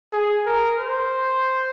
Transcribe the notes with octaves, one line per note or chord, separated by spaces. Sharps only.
G#4
A#4
C5